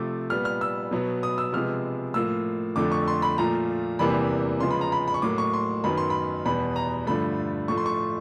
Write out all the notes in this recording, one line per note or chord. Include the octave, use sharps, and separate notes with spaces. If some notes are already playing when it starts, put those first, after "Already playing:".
Already playing: C3 F3 A3 D6
A#2 G3 B3 F6
F6
E6
B2 F#3 B3
D#6
E6
C3 F3 G#3 B3 F6
A2 F3 A#3 E6
F2 D3 F3 A3 D6
C#6
C6
B5
A#2 F3 A3 A#5
E2 C3 E3 G3 A#3 B5
C#3 F3 G#3 B3 C6
B5
A#5
B5
B5
C#6
A2 F#3 A#3 D6
C#6
C6
F#2 D#3 F#3 B3 B5
C6
B5
E2 B2 G3 B3 B5
A#5
G2 D3 F3 A3 B5
A2 F3 A3 C#6
C6
C#6